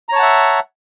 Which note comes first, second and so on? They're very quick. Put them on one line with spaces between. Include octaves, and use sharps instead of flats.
A#5 C#5 A5 F#5 E5